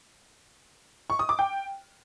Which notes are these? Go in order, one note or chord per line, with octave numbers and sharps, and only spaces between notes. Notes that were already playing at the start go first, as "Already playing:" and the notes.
C#6
D#6
D6
G5